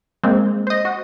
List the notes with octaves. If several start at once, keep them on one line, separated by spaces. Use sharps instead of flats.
G#3 A#3 C4
C5 D#5
F#4